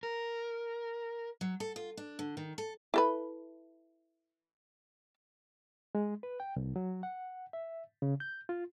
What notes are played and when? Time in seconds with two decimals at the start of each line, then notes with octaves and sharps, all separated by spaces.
0.03 A#4
1.41 F#3
1.60 A4
1.76 F4
1.97 D4
2.19 D3
2.37 D#3
2.58 A4
2.94 E4 A4 B4
5.95 G#3
6.23 B4
6.40 G5
6.56 C2
6.76 F#3
7.03 F#5
7.53 E5
8.02 C#3
8.20 G6
8.49 F4